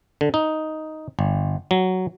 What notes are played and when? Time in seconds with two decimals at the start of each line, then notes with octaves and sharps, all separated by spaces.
0.21 D3
0.34 D#4
1.19 G1
1.71 F#3